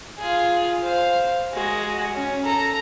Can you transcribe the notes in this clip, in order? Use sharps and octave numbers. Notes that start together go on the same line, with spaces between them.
F4 G#4
C5 F5
G#3 F#4
C#4
A4 A#5